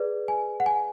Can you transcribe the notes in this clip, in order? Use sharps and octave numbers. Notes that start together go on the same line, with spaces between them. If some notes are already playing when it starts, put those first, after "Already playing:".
Already playing: G#4 B4 D5
G#5
F#5
G#5